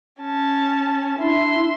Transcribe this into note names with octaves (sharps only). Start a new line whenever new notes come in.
C#4 A5
D4 E4 E5 C6